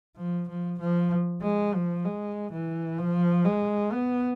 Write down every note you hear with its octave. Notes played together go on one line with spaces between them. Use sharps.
F3
F3
F3
G#3
F3
G#3
E3
F3
G#3
B3